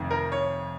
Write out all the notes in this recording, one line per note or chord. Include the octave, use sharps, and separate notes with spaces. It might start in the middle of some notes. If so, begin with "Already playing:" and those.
Already playing: F1 F2 D#3
A#4
C#5